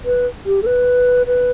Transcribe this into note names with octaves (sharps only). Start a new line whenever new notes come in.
B4
G4
A4
B4
B4